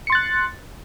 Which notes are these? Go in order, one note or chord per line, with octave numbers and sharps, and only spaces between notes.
C6 F#6 A6 C#7